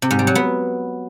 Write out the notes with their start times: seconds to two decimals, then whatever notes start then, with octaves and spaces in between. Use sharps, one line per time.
0.02 C3
0.11 G#2
0.19 G3
0.27 F#3
0.35 B3